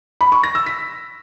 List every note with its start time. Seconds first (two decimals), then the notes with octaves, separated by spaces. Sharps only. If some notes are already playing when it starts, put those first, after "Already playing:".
0.21 B5
0.32 C#6
0.43 A#6
0.55 E6
0.66 B6